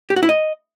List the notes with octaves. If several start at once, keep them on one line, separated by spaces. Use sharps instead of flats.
G4
F#4
E4
D#5